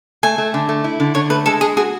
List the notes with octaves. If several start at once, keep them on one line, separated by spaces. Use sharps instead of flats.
A3 G#5
A3
D3
A3
E4
D3
D3 C#5
A3 B4
G#3 A4
G#3 G#4
F#4 G#4